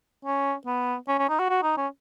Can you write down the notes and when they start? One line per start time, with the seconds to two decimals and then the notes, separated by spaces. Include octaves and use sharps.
0.25 C#4
0.66 B3
1.08 C#4
1.19 C#4
1.29 D#4
1.39 F#4
1.49 F#4
1.63 D#4
1.77 C#4